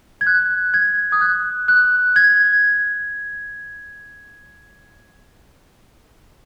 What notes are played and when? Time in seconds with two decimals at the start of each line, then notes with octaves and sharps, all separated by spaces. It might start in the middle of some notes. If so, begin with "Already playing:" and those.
0.21 G#6
0.27 F#6
0.74 G#6
1.12 D#6
1.21 F#6
1.68 F#6
2.16 G#6